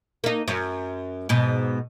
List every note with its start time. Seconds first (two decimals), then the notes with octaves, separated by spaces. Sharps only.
0.24 A#3 D#4
0.48 F#2
1.29 G#2 B2